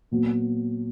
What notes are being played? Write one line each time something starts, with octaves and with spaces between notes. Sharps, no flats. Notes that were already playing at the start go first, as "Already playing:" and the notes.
A#2 F#3 B3